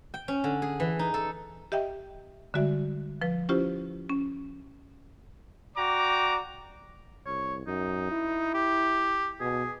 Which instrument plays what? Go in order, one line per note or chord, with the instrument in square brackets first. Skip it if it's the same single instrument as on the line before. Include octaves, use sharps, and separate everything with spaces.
[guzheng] G5
C#4
D3
G#4
E3
D#4
A4
[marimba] G4 D#5 E5 G5
D3 G3 G#3 F#4 D5 E5
F3 B4
C#4 E4 F4 G4 C5
C#4
[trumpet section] F#4 D5 G5 A#5 D6
[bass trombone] C2 [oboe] C#5
[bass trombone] F#2 [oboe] D#4
[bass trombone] E4
[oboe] G4
[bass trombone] B2 [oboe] G#4